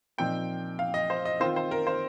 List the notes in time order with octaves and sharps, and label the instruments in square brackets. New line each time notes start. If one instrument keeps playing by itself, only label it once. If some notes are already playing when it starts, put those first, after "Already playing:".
[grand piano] A#2 F3 C4 D#4 G5
F5
D#5
C5
D#5
D#3 C4 F4 C5
C5
A#4
C5